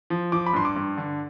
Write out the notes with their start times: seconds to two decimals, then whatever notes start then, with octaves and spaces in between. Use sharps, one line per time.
0.10 F3
0.32 F3 D6
0.46 B5
0.54 G2 C6
0.65 D6
0.76 G2
0.98 D3